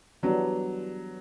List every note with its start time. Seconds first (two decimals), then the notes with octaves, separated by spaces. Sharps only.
0.23 E3 F#3 G3 B3 D4